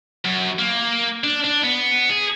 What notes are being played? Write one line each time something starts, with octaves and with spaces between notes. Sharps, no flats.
F#2
A#3
D4
D4
B3
G#4